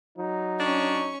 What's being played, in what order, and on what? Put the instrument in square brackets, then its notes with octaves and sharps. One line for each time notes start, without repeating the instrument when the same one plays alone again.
[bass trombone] F#3 [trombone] D#4
[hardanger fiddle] C#4 C#6 [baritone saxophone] D4